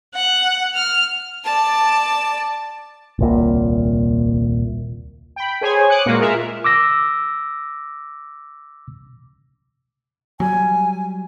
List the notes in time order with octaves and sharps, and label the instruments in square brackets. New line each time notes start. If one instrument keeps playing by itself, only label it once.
[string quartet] F#5
F6
[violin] D5 A5
[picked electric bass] D#1 C2 A#2
[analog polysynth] G5 B5
G#4 C5 C#5 G#5
D6 D#6 F#6 C#7
A#2 G#3 A#3 F4 F#4
F4 G#4 A#4 E5
[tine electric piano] D6 E6 A#6
[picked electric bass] F#3 G3 [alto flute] G#5